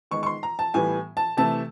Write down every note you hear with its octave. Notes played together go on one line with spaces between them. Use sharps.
D#3 G#3 B3 C#6
C#6
C6
A#5
A5
A2 E3 G3 B3 G#5
A5
C3 E3 A3 A5